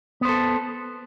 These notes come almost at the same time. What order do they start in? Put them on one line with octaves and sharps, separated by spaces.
B3 C5 A4